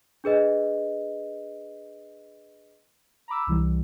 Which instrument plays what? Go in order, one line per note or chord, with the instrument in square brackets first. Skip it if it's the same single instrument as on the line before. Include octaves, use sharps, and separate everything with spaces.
[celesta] D4 G#4 B4 D#5
[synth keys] A#5 B5 D6 E6
C2 E3 G3